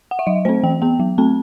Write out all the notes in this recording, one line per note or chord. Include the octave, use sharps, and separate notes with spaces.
F#5
E5
F#3 D#5
A3 C4 C5
E3 G5
B3 G5
F#3
A3 C4 A5